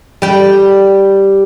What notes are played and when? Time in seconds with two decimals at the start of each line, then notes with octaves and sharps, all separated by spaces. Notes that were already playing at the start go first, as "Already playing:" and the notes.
0.22 G3 G5